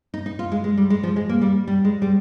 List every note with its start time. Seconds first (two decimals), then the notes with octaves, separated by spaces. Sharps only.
0.14 D#4
0.26 D#4
0.39 F4
0.52 G#3
0.64 G#3
0.78 G3
0.90 G#3
1.03 F3
1.16 G#3
1.29 A#3
1.41 G3
1.68 G3
1.85 G#3
2.02 G3